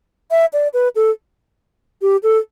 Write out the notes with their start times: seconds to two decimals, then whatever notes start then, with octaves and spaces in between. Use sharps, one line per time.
0.31 E5
0.53 D5
0.74 B4
0.96 A4
2.02 G4
2.23 A4